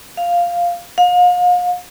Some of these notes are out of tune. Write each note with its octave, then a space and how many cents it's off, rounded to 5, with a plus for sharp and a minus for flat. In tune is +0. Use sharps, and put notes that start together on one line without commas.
F5 +0
F5 +40